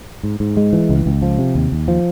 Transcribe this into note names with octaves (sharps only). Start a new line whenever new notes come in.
G#2
G#2
G#3
E3
C#2
C#2
F3
C3
D#2
D#2
F3